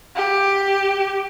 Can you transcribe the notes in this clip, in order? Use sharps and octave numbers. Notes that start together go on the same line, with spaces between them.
G4